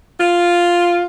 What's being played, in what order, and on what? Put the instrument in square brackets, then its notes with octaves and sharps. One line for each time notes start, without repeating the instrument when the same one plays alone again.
[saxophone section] F4